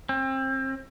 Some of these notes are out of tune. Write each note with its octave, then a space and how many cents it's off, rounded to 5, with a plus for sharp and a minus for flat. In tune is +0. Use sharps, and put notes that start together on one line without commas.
C4 +30